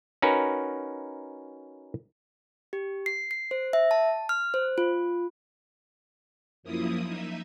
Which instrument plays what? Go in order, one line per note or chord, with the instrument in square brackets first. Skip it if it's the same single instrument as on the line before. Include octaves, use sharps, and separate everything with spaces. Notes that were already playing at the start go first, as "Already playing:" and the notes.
[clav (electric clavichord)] C#4 D#4 F#4 A#4 B4
[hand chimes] G4
C7
C7
C5
E5
A5
F6
C5
F4
[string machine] F#2 F3 A#3 E4 D#6
D#4 E5